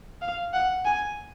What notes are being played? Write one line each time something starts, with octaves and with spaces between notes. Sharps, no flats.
F5
F#5
G#5